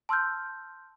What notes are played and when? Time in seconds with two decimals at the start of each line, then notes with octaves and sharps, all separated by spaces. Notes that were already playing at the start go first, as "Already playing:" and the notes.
0.09 A5 C6 E6 F6 G6